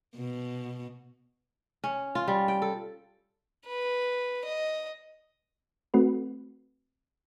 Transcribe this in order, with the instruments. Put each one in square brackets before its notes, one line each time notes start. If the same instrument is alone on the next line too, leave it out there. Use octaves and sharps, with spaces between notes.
[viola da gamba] B2
[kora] C#4
F4
G3
G5
A4
[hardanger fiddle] B4
D#5
[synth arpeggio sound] A3 C4 F#4 B4